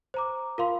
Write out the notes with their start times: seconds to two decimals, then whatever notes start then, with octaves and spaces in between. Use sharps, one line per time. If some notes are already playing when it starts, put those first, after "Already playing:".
0.14 C5 A#5 D6
0.58 F4 A#4 F5 C6